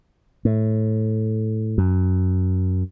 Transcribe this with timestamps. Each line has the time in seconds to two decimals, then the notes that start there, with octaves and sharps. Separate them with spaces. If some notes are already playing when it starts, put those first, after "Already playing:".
0.45 A2
1.78 F#2